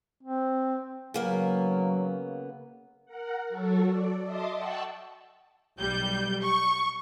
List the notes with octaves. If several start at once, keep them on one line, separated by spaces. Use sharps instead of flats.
C4
C#3 F#3 A#3 B3
A#4 F#5
F#3 F#4 A4
D5
D#5 E5 A5 C6 D6 D#6
F#5 G5 A5 C#6 E6 F#6
B1 G3 G6
C#6